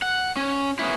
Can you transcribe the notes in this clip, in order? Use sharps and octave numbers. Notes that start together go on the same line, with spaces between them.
F#5
C#4
B3 C#4 E4